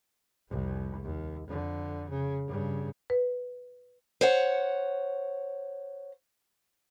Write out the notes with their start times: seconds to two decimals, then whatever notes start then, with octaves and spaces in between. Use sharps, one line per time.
0.49 C2 F2
1.02 D#2
1.47 F2 D3
2.09 C#3
2.47 G2 C#3
3.10 B4
4.21 C5 C#5 F#5